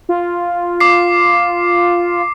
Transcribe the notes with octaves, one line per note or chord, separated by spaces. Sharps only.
F4
D6 C7